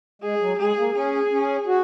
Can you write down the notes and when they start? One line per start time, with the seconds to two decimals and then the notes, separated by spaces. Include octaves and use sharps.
0.22 G#3 G#4
0.40 F#3
0.59 G#3 G#4
0.77 A#3
0.94 C#4 G#4
1.32 C#4
1.67 F#4